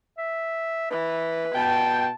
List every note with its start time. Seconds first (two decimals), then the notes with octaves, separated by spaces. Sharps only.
0.18 E5
0.91 E3 B4
1.54 B2 G5 A5